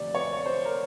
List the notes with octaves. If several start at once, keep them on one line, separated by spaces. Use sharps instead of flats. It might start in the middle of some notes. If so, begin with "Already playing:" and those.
Already playing: D2 C3 F3 D5
C#5
C5
A#4